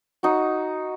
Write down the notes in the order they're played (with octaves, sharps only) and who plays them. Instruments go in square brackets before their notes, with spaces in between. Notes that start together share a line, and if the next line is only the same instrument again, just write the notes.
[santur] D#4 F#4